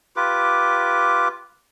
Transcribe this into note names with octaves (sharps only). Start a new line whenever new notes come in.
F4 G4 B4 D6